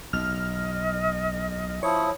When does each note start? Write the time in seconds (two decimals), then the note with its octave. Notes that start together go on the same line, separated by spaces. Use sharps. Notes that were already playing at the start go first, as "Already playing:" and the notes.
0.13 B1 D#5 F6
1.83 F3 E4 C#5 D#6